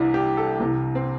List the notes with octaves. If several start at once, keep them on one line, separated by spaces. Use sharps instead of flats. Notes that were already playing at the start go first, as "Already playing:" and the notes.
Already playing: C2 C3 E3 D4 E4
G4
A4
C2 C3 E3
C4